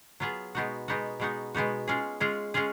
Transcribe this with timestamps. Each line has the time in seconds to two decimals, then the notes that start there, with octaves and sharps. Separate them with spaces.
0.20 F#3 B3 F4 G#4
0.55 B2 G#3 B3 D#4 F#4
0.88 B2 G#3 B3 D#4 F#4
1.20 B2 G#3 B3 D#4 F#4
1.54 B2 G#3 B3 D#4 F#4
1.88 G#3 C#4 F4 G#4
2.20 G#3 C#4 F4 G#4
2.54 G#3 C#4 F4 G#4